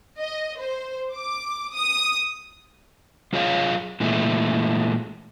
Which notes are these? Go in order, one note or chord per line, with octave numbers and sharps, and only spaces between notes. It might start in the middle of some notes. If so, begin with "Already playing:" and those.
D#5
C5
D6
D#6
F#3 F4 G#4 C#5 F5
A#2 E3 G#3 A3